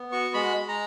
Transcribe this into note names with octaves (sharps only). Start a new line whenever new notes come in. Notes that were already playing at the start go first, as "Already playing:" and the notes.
Already playing: B3
F#4 C#6
G#3 B5
G#3
A#5